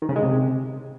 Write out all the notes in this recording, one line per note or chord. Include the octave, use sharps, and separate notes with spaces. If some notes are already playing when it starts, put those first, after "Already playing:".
D#3
C#3
G#3
C3